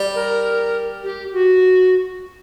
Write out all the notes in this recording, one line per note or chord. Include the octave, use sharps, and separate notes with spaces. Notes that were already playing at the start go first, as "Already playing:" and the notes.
Already playing: G3
A#4
G4
F#4